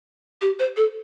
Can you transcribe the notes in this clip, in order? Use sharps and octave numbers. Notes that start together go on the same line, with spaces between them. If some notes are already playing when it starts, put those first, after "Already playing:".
G4
C5
A4